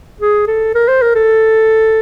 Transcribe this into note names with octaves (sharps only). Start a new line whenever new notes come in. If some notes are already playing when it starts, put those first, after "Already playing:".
G#4
A4
A#4
C5
A#4
A4